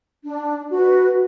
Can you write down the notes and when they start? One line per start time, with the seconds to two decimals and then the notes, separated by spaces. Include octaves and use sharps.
0.24 D4
0.70 F#4 B4